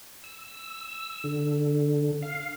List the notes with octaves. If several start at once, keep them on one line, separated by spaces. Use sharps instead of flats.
E6
D3
F5